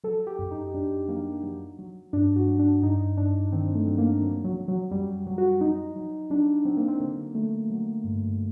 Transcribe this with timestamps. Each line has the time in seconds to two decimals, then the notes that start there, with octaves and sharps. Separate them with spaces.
0.04 F#3 A4
0.27 G4
0.39 F#2
0.51 D#4
0.74 F#2 D4
1.08 F#3 A#3
1.43 F#3
1.79 F#3
2.13 G2 D4
2.36 F#4
2.48 F#3
2.59 D4
2.83 G2 D#4
3.17 G2 D4
3.52 D#3 C4
3.75 A3
3.87 F#3
3.98 A#3
4.22 F#3
4.44 F#3
4.57 F#3
4.68 F#3
4.91 F#2 G3
5.27 F#3
5.38 F#4
5.61 F#3 D#4
5.96 F#3
6.30 F#3 D4
6.65 F#3 C4
6.77 A#3
6.88 C4
7.00 D3 A#3
7.35 D3 A3
7.70 F#3
8.04 G2